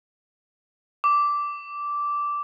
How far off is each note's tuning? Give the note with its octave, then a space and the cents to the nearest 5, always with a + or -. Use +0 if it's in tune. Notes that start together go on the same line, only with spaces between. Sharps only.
D6 -10